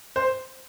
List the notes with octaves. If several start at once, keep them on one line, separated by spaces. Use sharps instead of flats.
C5